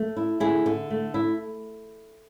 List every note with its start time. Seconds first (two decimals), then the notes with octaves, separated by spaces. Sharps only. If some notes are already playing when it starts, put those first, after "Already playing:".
Already playing: A3
0.17 E4
0.40 D3 E4 G#4
0.66 D3
0.90 A3
1.14 E4